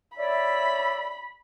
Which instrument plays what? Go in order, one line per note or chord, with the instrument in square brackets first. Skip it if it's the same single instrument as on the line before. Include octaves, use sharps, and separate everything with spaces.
[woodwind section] C#5 D5 E5 [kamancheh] B5